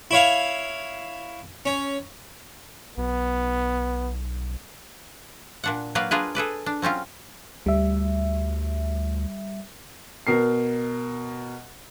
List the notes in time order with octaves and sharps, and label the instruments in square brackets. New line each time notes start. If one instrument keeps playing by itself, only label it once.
[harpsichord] E4 C#5 F5
C#4
[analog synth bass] B1 [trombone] B3
[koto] A#2 D4 F#5
F#3 A#3 B4 D5 F5
D4 F4 G#4 A#4 B4
G#4 A4 B4 D5
D4
F#3 C4 C#4 F4
[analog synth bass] D2 [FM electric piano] G3 E5
[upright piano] B2 A#4 C7